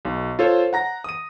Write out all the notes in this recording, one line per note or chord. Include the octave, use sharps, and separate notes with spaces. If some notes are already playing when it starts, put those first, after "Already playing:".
B1
F4 A4 C5 C#5
F#5 A#5 A#6
D#6 D#7